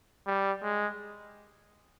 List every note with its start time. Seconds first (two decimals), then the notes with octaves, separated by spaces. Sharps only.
0.27 G3
0.63 G#3